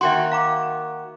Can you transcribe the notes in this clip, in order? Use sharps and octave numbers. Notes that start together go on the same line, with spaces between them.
D#3 A#3 F#4 E5 G5 C6
F5 A#5 D6